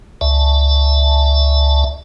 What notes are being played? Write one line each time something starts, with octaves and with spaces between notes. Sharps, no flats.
C#2 D5 E5 A5